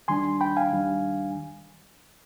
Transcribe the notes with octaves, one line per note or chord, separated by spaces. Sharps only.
D#2 D#3 G3 D4 G#5 C6
G5 B5
F5 G#5
D#2 D#3 G3 D4